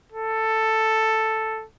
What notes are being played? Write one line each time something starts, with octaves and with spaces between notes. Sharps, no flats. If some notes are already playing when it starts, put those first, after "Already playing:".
A4